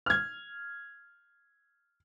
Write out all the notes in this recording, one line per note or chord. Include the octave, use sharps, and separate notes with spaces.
F6 G#6